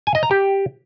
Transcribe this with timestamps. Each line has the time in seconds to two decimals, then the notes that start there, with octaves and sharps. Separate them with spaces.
0.07 G#5
0.15 D#5
0.23 A#5
0.31 G4